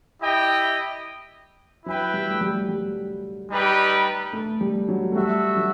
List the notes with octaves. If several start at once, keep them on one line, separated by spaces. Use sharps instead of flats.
E4 G4 D#5 G5
F#3 E4 B4 E5 G5
G3
A3
G3
G3
G3 D#4 G4 B4
A3
G3
F#3
A3
G3 F#4 A4 E5
F#3